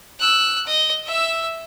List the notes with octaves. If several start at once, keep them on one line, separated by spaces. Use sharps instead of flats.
E6 F#6
D#5
E5 E6